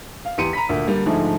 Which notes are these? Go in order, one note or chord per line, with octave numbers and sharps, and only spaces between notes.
F5
E2 G4 C6 C#7 D#7
A#5 B5 B6
D2 A#2
D3 G3 A#3 D4
G#2 D3 F3 G#3 A3